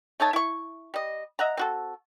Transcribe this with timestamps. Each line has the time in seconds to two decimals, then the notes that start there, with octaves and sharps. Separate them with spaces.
0.20 A3 D#4 C#5 A5
0.33 E4 C#6
0.94 G3 D#5
1.39 D#5 E5 F#5 A#5
1.57 C4 F#4 A4